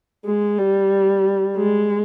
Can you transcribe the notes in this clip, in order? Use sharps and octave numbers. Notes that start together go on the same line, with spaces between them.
G#3
G3
G#3